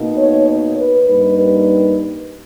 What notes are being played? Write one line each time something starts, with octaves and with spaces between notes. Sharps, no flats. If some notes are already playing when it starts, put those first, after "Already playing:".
Already playing: B2 A#3 D#4
C#5
C#5
B4
G2 G3 A#3 D#4 B4
B4